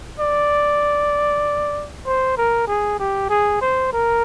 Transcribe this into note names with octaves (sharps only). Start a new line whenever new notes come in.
D5
C5
A#4
G#4
G4
G#4
C5
A#4